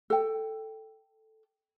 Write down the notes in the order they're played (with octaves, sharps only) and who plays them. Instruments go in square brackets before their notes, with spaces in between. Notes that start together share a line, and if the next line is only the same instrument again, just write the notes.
[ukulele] A4 G5